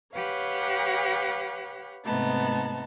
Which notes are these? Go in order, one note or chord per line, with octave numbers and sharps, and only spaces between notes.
G4 B4 C#5 F5 F#5
G#2 C3 A3 B3 D#4 A5